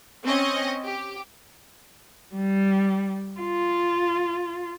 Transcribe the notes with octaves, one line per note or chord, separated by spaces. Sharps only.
C4 C#4 D#5
G4
G3
F4